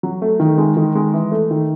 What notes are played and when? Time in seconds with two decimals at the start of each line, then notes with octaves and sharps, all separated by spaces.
0.03 F#3
0.22 A3
0.40 D#3
0.58 G#3
0.77 D#3
0.95 G#3
1.13 E3
1.32 A3
1.51 D#3